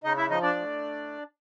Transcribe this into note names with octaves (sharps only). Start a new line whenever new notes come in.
C#3 D#4 D#5
E4 E5
F3 D#4 D#5
D4 D5
A2